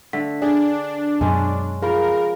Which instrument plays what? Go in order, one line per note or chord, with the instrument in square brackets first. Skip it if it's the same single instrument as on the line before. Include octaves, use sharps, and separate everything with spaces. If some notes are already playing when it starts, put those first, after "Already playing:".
[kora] D3 A3 [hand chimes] B6
[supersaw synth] D4 [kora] G#4 [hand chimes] D5
[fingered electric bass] F#2 B2 [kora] G#3 C#4
[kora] F3 [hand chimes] G#4 B5 [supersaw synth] A#4